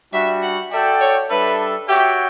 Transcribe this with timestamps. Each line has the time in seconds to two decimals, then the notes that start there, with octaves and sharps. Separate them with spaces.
0.13 G3 D4 F#4 E5
0.43 F#5
0.72 F#4 A4 D5 E5 G5
1.00 C#5
1.30 G3 D4 A4 B4 E5
1.88 F#4 G4 C#5 E5 G5